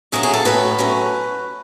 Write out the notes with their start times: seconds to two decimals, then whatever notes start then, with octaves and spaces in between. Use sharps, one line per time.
0.12 A2 F#3 A3 C#4 G#4
0.23 G#4
0.34 A4
0.45 A2 F#3 A3 C#4 B4
0.78 A2 F#3 A3 C#4